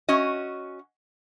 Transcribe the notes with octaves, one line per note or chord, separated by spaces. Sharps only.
C#4 F#4 D#5